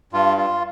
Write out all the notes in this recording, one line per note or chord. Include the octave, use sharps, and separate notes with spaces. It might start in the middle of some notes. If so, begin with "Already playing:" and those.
G2 F4
F4